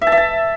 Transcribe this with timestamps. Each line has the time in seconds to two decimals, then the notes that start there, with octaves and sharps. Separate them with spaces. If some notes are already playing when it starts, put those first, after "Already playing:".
0.01 E5
0.07 A5
0.12 E5
0.17 A5